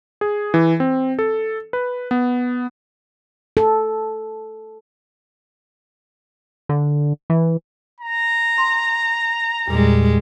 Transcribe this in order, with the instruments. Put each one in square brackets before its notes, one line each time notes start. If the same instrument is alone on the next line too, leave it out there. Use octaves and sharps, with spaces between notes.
[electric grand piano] G#4
E3
C4
A4
B4
B3
[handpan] A4
[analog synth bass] D3
E3
[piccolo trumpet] A#5
[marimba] C6
[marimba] E2 A#2 [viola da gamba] G3 G#3